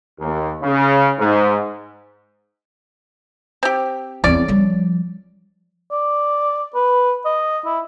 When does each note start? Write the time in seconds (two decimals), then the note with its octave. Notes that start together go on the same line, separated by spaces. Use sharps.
0.20 D#2
0.63 C#3
1.19 G#2
3.63 C4 G4
4.24 E2 C4 C#4 D5
4.48 F3 G3
5.91 D5
6.75 B4
7.25 D#5
7.65 E4